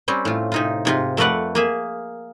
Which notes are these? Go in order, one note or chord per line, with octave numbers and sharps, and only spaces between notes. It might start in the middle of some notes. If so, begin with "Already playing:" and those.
G3 C4 C#4
A2 F4
C3 D#4 F4
G#2 C3 F4
F2 A3 A#4 B4 D5 F#5
A#3 G#4 E5